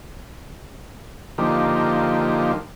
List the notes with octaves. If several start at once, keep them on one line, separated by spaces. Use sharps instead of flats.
D3 F3 A#3 D#4 G4